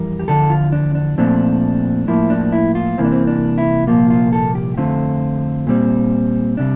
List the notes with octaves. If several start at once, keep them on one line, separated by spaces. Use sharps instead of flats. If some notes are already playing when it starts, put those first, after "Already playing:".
Already playing: F2 E3 G3 A#4
G4
E2 D3 F3 A4
F4
D4
D4
A#2 F3 A3 C4 D4
A2 F3 A#3 E4
D4
E4
F4
C2 C3 E3 A#3 C4
D4
C4
D4
E4
C2 A#2 F3 A#3 F4
F4
A4
G4
F2 D3 A3 C4 F4
A#2 G3 C4
C3 G3 D4